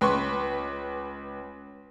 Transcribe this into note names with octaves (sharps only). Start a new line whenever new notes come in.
C#2 B4 C6 C#6